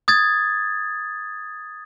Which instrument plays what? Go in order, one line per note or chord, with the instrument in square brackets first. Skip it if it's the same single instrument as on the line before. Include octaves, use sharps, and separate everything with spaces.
[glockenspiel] D#6 G#6 A6